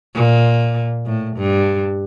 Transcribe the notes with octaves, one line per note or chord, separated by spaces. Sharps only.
A#2
A2
G2